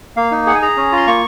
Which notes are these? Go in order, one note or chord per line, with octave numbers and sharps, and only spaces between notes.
A#3 F5
D#4
G#4 F#5
G#5
G#4 A#5
C#4
F4 C6
A#3 C#6